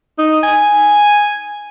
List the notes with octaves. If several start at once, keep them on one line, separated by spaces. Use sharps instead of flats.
D#4
G#5